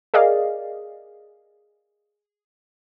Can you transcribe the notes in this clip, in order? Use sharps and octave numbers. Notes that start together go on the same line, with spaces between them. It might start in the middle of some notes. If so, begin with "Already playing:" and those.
G#4 A#4 D5 D#5 F5